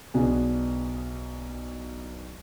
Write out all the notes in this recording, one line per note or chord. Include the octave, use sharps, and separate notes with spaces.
B1 B2 B3 D4 G#4